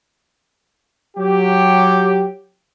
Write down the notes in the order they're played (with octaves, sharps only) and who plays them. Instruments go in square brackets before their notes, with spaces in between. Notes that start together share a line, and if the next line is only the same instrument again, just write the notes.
[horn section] F#3 G4